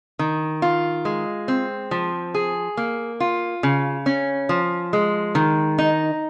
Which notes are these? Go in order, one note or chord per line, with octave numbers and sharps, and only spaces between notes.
D#3
F4
G#3
C4
F3
G#4
A#3
F4
C#3
C#4
F3
G#3
D#3
D#4